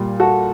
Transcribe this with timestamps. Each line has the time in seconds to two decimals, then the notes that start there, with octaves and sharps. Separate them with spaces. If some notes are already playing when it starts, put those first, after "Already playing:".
Already playing: A#2 G3
0.20 F#4 A4